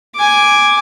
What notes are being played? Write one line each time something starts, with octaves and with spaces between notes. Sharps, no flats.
G#5 D6